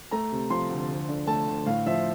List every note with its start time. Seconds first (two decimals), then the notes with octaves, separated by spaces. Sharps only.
0.11 A3 A#5
0.32 C3
0.50 F3 C6
0.70 D2
0.89 D2
1.09 D3
1.27 A3 A5
1.47 D2
1.66 A2 F5
1.86 F3 E5